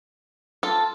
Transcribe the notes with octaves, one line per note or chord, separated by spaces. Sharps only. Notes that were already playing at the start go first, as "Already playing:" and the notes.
F4 A4